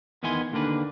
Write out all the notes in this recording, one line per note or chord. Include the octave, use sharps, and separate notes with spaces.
E2 D#3 B3 E4 G#5 C6
D#2 D3 A#3 D4 B4